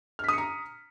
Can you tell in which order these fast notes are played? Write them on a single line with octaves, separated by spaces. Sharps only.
F6 B6 D#6 C#7 A#5